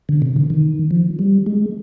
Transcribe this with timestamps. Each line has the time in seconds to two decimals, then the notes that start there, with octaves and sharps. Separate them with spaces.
0.09 D3
0.22 C3
0.36 D3
0.50 D#3
0.91 F3
1.19 G3
1.46 G#3